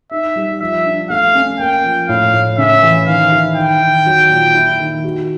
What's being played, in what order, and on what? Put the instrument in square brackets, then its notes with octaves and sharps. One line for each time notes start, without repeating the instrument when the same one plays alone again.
[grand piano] D#4 [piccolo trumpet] E5
[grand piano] G3
[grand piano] F3 [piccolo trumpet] E5
[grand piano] D4
[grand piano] A3 [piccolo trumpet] F5
[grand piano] C#4
[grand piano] A#3 [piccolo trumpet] G5
[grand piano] F3
[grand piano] A2 [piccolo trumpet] F5
[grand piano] A2
[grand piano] C#3 [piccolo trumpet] E5
[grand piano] E3
[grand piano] D#3 [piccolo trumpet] F5
[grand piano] E4
[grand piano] D#3 [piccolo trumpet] G5
[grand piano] D#3
F#3
A#2
E4
D#3
F#4